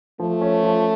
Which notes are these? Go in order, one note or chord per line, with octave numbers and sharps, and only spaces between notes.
F3 A3
C#4
F3